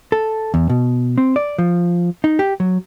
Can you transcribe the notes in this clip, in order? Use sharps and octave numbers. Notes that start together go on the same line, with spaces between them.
A4
E2
B2
C4
D5
F3
D#4
G4
F#3